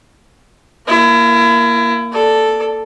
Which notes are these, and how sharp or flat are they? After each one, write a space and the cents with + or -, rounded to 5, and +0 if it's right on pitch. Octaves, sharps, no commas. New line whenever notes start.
A#3 +0 E4 +30
A4 +0 D5 +0